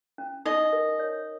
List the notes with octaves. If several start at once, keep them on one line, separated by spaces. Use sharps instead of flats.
C#4
D#4 D#5
A#4
C#5